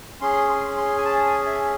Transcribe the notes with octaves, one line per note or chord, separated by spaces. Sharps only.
C#4 G#4 C6
C6
C6
G#5
A5
G#5
E5